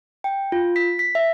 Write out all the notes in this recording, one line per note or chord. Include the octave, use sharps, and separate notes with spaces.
G5
F4
B6
B6
E5